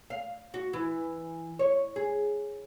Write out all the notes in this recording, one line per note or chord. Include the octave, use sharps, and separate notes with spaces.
F5
F#4
E3
C#5
G#4